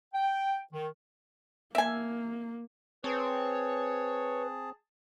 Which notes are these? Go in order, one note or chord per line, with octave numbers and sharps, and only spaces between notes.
G5
D#3
A#3 E5 G#5
C4 G#4 B4 C#5 A5